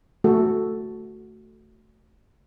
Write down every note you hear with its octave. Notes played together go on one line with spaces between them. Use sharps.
A3 F#4 A4